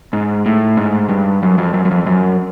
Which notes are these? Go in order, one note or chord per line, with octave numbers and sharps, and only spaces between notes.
G#2
A2
G#2
G2
F#2
F2
F#2
F#2
F2
F#2